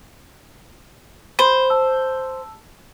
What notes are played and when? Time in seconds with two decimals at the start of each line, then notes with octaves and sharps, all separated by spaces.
1.39 C5 B5 C6
1.70 A5 E6